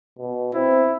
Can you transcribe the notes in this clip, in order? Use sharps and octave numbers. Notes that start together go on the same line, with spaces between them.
B2
C4 E4